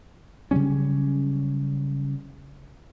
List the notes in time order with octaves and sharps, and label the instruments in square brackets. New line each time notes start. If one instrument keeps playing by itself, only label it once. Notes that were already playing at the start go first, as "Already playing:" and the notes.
[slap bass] C#3 F#3 G3 C#4